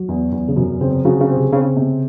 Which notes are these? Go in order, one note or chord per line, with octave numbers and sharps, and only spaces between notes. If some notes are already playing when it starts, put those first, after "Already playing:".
Already playing: F#3 F#4
E2
E2
C#3
F#2 C3
C#3 C4
C#3 F#3
C#3
C4
C3
C#3 C4
C3